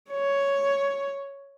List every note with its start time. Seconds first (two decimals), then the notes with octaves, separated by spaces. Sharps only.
0.11 C#5